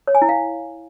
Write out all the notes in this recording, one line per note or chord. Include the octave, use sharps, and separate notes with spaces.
C#5
G#5
E4
F5